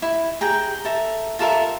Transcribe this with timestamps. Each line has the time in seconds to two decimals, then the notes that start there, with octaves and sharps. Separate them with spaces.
0.02 E4
0.41 G#4 G5 A#5
0.85 A4 E5 A#5
1.39 F4 A4 A#4 E5